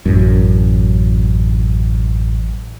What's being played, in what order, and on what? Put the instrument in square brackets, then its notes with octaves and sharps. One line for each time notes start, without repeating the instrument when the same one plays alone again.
[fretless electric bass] A1 F#2